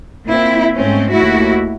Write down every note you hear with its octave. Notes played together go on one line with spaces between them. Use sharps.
A#2 C4 E4
G#2 A3 C4 C#4
D#2 A3 E4 F#4